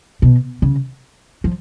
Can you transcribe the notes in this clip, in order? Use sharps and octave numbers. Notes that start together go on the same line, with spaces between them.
B2
C#3
F3